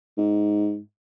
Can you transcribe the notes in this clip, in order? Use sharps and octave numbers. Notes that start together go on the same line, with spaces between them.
G#2